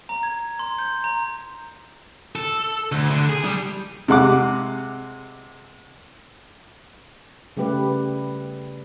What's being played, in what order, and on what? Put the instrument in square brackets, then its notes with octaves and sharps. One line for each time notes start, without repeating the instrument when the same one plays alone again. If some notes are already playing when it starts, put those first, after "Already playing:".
[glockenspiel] A#5
G#6
C6
G6
A#5
[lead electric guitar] A4
D2
D3
G#4
G3
[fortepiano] C3 G#3 F#5 D6
[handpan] C#3 G3 A3 G4 B4